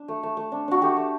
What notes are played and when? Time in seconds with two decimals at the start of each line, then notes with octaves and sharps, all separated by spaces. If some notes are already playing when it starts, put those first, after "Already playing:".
Already playing: D4
0.08 A3
0.23 A3
0.37 A3
0.52 D4
0.68 D4 F#4
0.82 A3 G4
0.97 A3